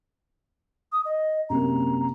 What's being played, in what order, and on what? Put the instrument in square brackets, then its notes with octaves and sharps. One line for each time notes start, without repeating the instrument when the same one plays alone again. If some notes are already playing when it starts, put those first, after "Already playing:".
[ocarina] D#6
D#5
[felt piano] F#2 C3 A#3 [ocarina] A#5